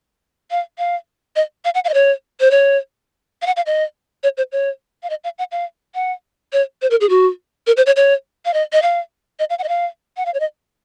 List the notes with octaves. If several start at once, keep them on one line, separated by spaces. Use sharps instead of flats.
F5
F5
D#5
F5
F#5
F5
D#5
C#5
C5
C#5
F5
F#5
F5
D#5
C#5
C5
C#5
F5
D#5
F5
F#5
F5
F#5
C#5
C5
A#4
G#4
F#4
A#4
C5
C#5
C#5
F5
D#5
D#5
F5
D#5
F5
F#5
D#5
F5
F#5
F5
C#5
D#5